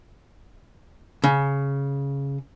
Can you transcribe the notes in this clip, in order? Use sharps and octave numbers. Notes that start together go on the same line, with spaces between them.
C#3